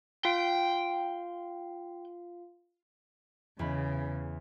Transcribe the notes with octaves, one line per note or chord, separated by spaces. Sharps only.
F4 F5 G5
E2 C#3 B5